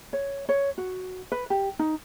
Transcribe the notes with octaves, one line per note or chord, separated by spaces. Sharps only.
C#5
C#5
F#4
B4
G4
D#4